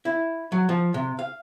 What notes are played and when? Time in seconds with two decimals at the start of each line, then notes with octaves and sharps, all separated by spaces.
0.05 E4
0.52 F#3
0.69 F3
0.94 C3
1.19 F5